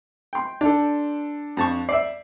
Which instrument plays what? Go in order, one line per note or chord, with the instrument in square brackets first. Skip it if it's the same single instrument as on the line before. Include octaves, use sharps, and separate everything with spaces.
[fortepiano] G5 C6
[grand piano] D4 A4
[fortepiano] F2 A5 C#6
[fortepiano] D5 E5 [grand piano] C7